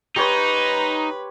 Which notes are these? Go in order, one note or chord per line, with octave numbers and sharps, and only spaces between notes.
D#4 G4 B4 C#5 C6